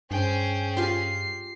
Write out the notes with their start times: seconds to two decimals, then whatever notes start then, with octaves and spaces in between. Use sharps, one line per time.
0.11 G2 C#4 G#4 C5 G5
0.77 F4 G4 F5 C7